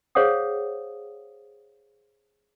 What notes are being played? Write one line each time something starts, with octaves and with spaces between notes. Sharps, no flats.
G#4 C5 C#5 F5 F#5 D#6